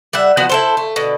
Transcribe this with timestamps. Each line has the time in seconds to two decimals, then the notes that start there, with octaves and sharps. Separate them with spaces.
0.13 G3 E5 F#5
0.37 F3 B3 F#4 F#5
0.49 E4 A4 C5
0.77 A3
0.96 B2 D3